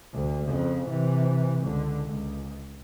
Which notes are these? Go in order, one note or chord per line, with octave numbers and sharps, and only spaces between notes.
D2
F2 C#3
C3 E3
C#2 D3
C#2